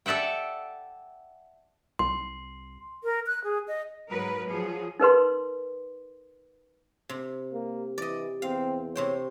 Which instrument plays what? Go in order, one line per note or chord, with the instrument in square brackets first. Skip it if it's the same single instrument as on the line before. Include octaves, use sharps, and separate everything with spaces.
[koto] A4 D5 E5 F#5 G5
[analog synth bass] C2 [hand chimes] C6
[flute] A#4
F#6
G#4
D#5
[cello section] G#2 F#3 A#4 B4
F3 F#3 G#4
[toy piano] D#4 A#4 B4 C6
[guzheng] C3
[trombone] A#3 [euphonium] G4
[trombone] E3 [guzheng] D5 D#5
[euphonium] E2 [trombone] C4 [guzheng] F5
[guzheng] C3 C5 G5 [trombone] C#5